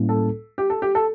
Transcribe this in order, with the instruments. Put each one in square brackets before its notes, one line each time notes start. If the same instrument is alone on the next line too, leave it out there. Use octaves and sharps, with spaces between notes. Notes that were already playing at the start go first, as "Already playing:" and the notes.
Already playing: [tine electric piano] A2 G3 A#3 C#4 E4
[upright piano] A4
G4
A4
G4
A4